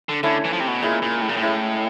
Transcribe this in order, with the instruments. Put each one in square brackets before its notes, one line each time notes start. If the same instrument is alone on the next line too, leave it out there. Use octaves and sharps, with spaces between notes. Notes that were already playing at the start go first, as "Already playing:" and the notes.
[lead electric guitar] D3
[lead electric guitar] D3 [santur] A3 C#4 E4
[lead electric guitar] E3
F3
C3
B2
[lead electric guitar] A#2 [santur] G#3 C#4 E4
[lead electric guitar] A#2
A2
A#2
A2
[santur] G#3 C#4 E4